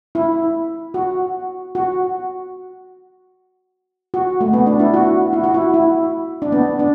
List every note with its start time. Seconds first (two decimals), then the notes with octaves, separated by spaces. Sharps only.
0.15 E4
0.94 F#4
1.75 F#4
4.14 F#4
4.41 A3
4.53 B3
4.66 D4
4.80 E4
4.94 F#4
5.33 E4
5.44 F#4
5.54 E4
5.74 E4
6.42 D4
6.52 B3
6.79 D4